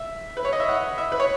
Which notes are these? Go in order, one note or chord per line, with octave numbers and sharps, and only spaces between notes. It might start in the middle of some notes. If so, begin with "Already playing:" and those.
Already playing: E5
B4
C#5
D#5
E5
F#5
E5
B4
C#5